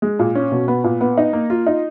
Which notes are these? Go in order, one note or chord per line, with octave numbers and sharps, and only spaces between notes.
G#3
A#2
C#4
B2
B3
A#2
B3
D#4
A#3
F4
D#4